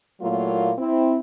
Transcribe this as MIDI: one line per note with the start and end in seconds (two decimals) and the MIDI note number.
0.22 0.72 46
0.22 0.72 54
0.22 0.72 57
0.22 0.72 58
0.22 0.72 64
0.22 0.72 65
0.79 1.18 60
0.79 1.18 64